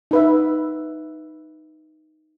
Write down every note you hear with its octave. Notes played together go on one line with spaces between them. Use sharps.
D#4 B4 E5